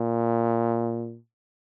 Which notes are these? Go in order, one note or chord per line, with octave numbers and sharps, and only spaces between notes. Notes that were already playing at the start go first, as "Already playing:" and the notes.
Already playing: A#2